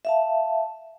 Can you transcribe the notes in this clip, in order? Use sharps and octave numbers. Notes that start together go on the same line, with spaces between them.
E5 F5 A5